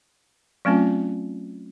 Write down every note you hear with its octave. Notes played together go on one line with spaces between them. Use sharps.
F#3 A3 C4 C#4 F4